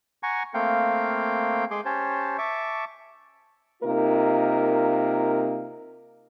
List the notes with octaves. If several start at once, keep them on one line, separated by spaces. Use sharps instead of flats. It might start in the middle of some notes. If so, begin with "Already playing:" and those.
F#5 G#5 A#5 C#6
A3 A#3 C4 F5 G5
G#3 G#4 C6 D6
C#4 G4 C5 C#5 A5
E5 A5 C#6 D6
C3 A#3 D#4 F4 A#4